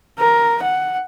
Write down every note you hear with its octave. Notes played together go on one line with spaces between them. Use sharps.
A#4
F#5